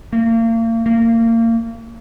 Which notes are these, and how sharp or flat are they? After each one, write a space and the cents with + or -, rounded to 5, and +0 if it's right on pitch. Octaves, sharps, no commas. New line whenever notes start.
A#3 -40
A#3 -30